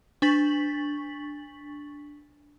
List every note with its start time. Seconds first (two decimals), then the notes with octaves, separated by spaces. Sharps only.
0.22 D4 C#6 A6 B6 F#7